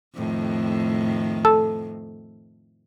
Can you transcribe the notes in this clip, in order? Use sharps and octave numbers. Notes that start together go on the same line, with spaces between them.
F2 A2 D#3
A4